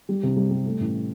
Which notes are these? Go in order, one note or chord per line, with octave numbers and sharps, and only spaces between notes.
G3
C3
G3
G3
A3
A1